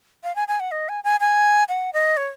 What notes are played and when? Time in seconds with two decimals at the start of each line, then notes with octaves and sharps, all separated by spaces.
0.24 F5
0.36 G#5
0.48 G#5
0.60 F#5
0.71 D#5
0.89 G#5
1.04 G#5
1.20 G#5
1.69 F#5
1.93 D#5
2.17 C#5